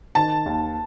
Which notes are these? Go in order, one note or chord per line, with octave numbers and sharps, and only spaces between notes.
D#3 A5
D#2